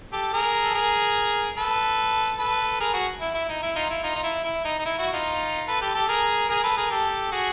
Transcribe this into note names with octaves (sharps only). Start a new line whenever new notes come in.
G4 A4
G#4 A#4
A4
G#4 A#4
A4 B4
A4 B4
G#4 A#4
F#4 G#4
E4
E4
D#4
E4
D#4 F4
E4
D#4 F4
D#4
E4
E4
D#4
D#4
E4
E4 F#4
D#4 F4
A4 B4
G4 A4
G4 A4
G#4 A#4
G#4 A#4
A4 B4
G#4 A#4
G4 A4
F#4 G#4